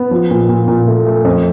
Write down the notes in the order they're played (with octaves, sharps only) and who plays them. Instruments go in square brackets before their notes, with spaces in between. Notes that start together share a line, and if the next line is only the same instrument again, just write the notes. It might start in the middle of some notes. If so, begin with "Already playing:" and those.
Already playing: [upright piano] B3
F3
A#2
A#2
A#2
A3
A3
F2